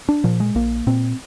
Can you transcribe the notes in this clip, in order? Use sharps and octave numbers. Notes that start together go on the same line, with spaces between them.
D4
A#2 F3
G#3
A#1 A#3
A#2 C4